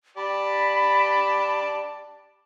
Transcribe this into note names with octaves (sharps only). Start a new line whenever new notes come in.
G4 D5 A5 B5